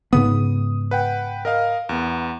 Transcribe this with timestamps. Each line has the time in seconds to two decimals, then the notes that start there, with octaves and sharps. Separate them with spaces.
0.13 G#2 C#3 B3 D#6
0.91 B4 F#5 G5
1.45 A#4 D#5 F5
1.89 E2 B3